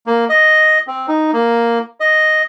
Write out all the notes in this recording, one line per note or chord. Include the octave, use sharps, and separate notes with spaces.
A#3
D#5
C4
D#4
A#3
D#5